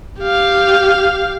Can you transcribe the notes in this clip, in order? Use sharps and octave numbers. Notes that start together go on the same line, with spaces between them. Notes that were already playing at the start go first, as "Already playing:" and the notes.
G4 F5